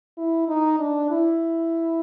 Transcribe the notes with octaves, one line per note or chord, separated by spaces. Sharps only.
E4
D#4
D4
E4